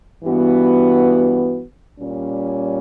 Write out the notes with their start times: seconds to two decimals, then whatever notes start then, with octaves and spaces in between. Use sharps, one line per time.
0.23 G2 E3 B3 F#4
1.98 A#2 G3 C#4